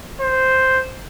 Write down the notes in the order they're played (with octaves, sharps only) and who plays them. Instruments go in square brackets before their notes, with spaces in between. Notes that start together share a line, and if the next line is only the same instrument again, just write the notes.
[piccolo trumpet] C5